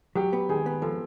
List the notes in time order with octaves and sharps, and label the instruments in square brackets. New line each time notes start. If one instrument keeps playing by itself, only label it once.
[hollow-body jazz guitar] F#3 [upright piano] G4
[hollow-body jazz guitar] B3
[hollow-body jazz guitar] D#3 [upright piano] G#4
[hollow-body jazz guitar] B3
[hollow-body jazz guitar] F3 [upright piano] A4